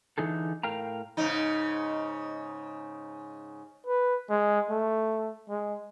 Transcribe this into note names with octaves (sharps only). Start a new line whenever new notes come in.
D3 E3 D#4 G#4 A4
A2 A#4 F5 G5 A#5
G#2 C#3 D#4
B4
G#3
A3
G#3